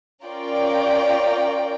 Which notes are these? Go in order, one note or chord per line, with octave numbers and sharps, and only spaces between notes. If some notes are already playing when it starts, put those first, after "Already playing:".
C#4 F4 A#4 D5 G5